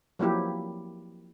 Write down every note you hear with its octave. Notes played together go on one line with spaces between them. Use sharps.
F3 F#3 A#3 E4 G4